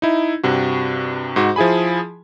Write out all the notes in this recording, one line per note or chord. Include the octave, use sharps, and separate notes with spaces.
D#4 E4
G2 C3 F#4
G#2 F#4
F3 E4 G#4 G#5 B5